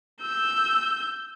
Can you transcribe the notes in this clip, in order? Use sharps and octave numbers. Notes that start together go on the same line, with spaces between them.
E6 G6